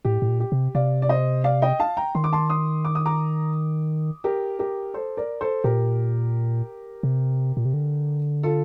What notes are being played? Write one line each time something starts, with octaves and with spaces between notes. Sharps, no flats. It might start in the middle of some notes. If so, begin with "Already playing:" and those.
A2 G4
A2
A#2
G4
C3
C3 D5 F5
D5
C5 D#5
D5 F5
D#5 G5
F5 A5
G5 A#5
D#3 C6
D6
A5 C6
C6 D#6
D6
D#6
A#5 D6
G4 A#4
G4 A#4
A4 C5
A#4 D5
A4 C5
A#2 G4 A#4
C3
A#2
C3
D3
F4 A4